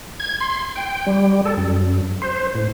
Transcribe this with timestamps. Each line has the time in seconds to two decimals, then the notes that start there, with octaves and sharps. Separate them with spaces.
0.20 G#6
0.40 C6
0.76 G5
1.07 G3
1.45 A4
1.57 F#2
2.22 C5
2.55 A2